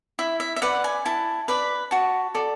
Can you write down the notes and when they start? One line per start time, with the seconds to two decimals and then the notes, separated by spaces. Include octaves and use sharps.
0.19 E4 E5
0.40 E5
0.56 E5
0.62 B4 D5 F#5
0.84 G#5
1.06 E4 A5
1.48 B4 D5 B5
1.91 F#4 A5
2.35 A4 D5